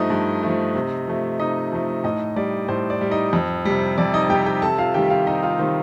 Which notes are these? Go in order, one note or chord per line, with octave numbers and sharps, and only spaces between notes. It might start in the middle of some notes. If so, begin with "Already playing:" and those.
Already playing: G2 F3 A3 D#4 D#5
G2
F3 A3
C3
F3 A3
C3 D#4 D#5
F3 A3
A2 D#4 D#5
G3 D5
A2 C5
D5
G3
D#4 D#5
F2
C3 G3
F2 D5
D#4 D#5
C3 G3 G4 G5
G4 G5
C3 A4 A5
F4 F5
D#3 G3 G4 G5
F4 F5
C3 D#4 D#5
F4 F5
D#3 G3 C5